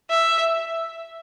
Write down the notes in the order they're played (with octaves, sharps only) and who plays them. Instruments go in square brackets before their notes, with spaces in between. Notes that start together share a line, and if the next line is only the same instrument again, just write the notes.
[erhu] E5